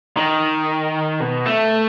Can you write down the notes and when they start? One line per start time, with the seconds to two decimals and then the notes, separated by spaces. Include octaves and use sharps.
0.17 D#3
1.20 B2
1.46 A3